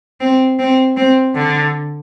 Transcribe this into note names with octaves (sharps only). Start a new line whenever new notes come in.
C4
C4
C4
D3